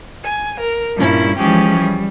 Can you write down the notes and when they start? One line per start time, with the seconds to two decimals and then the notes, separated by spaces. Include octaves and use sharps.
0.23 G#5
0.61 A#4
0.95 G2 A#2 G3 C#4 E4
1.38 E3 F3 G#3 C#4 G4 G#4
1.78 G3